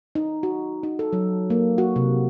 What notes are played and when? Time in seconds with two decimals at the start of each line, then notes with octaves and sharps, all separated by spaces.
0.15 D#4
0.43 F#4
0.83 D#4
0.99 A4
1.13 F#3
1.50 A#3
1.78 F#4
1.96 C3